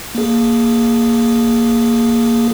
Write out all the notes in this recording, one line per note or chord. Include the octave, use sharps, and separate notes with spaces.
A#3 G#4